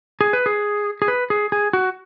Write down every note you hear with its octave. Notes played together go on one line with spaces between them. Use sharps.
G#4
B4
G#4
G#4
B4
G#4
G#4
F#4